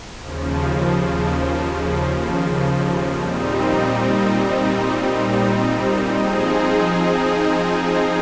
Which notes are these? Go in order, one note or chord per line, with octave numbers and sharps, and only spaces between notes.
D#2 C#3 F3
A#2 G3 C4 D#4
F3 C4 D#4 G#4